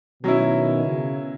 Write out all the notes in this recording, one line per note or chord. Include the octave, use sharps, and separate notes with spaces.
B2 D#3 F#3 C#4 E4
C#3